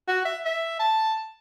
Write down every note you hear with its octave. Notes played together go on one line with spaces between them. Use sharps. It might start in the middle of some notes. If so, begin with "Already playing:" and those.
F#4
E5
E5
A5